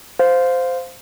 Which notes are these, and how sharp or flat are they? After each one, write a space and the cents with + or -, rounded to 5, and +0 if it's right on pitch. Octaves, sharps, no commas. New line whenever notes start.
C5 -10 F5 +10